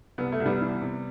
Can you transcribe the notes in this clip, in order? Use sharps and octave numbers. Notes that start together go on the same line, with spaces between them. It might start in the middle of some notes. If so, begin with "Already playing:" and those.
C2 B3
A3
C2
G3 B3
E3
C3